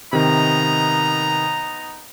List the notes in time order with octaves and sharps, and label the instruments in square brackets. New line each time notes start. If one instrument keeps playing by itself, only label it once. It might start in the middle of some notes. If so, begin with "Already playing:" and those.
[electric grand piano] C3 D#3 [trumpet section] B3 D#4 A#5